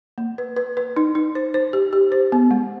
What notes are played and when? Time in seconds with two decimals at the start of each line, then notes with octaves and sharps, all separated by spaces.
0.18 A#3
0.38 B4
0.57 B4
0.77 B4
0.97 D#4
1.15 D#4
1.35 C5
1.54 C5
1.73 G4
1.93 G4
2.12 C5
2.32 B3
2.51 G#3